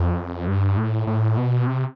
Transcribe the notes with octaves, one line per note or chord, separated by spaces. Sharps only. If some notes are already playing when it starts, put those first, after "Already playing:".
Already playing: F2
G2
A2
A2
B2
C3